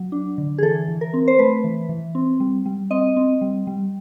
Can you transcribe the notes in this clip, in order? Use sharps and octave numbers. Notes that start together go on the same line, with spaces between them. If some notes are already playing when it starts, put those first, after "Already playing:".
Already playing: F#3
D4
D3
G#4
E3 A4
E3
A#4
C4
C5
A3 B4
E3
E3
C4
G3
G3
C4 D#5
C4
G3
G3